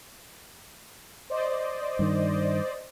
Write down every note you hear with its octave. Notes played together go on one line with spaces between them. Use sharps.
C5 D5 D#5
G2 D#3